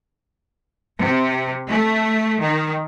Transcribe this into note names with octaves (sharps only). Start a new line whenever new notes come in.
C3
A3
D#3